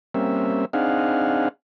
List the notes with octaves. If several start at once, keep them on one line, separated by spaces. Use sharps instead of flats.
G3 A#3 C4 C#4 E5
C4 D4 D#4 G#4 F5 F#5